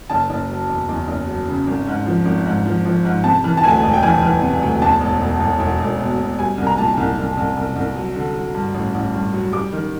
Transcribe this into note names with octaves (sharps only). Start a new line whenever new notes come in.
F#1 A5
F#1
F#3
E2
E2
F#1
F#3
C#3
G#1
G#2
F3
G#1
G#2
F3
F3
G#2
C3 A5
E3
A5
D2 G#5
E1
G5
E3 G#5
E3
C3
D2
E2 A5
E1
E1
E1
E1
E1
B2
B2
G3 G#5
C2
A#5
A#2 A5
C2
C2
C2
C2
C2
F#3
D3
F#3
G2
A1
A1
G2
F#3
G3 D6
D#3